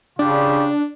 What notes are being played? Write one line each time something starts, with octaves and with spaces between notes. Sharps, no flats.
C#3 D4 F4 G4